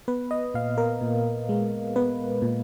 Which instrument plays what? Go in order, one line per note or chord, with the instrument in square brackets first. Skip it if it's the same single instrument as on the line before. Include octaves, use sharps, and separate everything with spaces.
[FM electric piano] B3 B4
D#5
A#2 F5
A#4
A#2
G#3
B3 B4
A#2